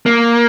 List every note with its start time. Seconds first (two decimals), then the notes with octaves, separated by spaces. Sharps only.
0.06 A#3